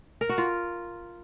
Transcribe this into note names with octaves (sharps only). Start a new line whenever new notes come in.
A#4
F#4
F4